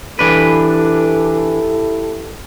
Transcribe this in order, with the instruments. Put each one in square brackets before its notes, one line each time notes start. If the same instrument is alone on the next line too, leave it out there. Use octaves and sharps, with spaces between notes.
[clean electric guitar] E3 D4 B4 [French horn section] E4 G4 A4